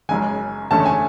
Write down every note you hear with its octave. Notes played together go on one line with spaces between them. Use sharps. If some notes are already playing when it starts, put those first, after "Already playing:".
F#1 F#2 C#3 G#3 G#5
F#1 E2 D3 A3 C#4 A5
G#5